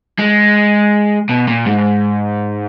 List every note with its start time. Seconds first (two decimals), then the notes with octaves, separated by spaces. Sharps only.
0.19 G#3
1.29 B2
1.48 A#2
1.66 G#2